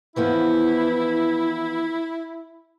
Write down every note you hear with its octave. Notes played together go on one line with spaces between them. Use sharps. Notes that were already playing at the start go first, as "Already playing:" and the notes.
E3 F3 B3 E4